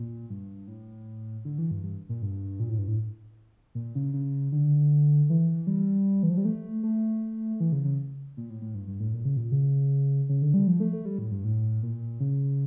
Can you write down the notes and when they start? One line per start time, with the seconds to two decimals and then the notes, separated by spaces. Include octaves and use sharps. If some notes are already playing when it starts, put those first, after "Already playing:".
Already playing: A#2
0.30 G2
0.68 A2
1.45 D3
1.58 E3
1.71 G2
1.83 G2
2.09 A#2
2.22 G2
2.60 A#2
2.69 A2
2.78 G2
2.88 A2
3.75 A#2
3.95 C#3
4.14 C#3
4.52 D3
5.30 E3
5.67 G3
6.23 E3
6.30 F3
6.37 G3
6.45 A3
6.83 A3
7.60 E3
7.72 C#3
7.85 C#3
8.37 A#2
8.50 A2
8.62 A2
8.75 G2
8.87 G2
9.00 A2
9.14 A#2
9.25 C#3
9.37 A#2
9.52 C#3
10.29 C#3
10.42 D3
10.54 G3
10.67 F3
10.80 A3
10.93 A3
11.05 G3
11.18 A2
11.31 G2
11.44 A2
11.83 A#2
12.20 C#3